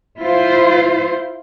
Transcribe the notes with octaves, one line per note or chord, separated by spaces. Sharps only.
E4 F4 C5